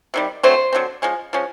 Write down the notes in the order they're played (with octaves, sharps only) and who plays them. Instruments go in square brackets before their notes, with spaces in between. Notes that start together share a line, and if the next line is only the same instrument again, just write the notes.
[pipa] C3 D#3 G3
D3 F#3 A3 C4 C5
D3 F#3 A3 C4
F3 G#3 C#4
F3 G#3 C#4